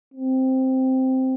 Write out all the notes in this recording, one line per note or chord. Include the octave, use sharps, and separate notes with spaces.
C4